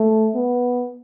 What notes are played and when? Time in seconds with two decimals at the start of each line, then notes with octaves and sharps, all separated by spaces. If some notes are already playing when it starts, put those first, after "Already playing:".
Already playing: A3
0.35 B3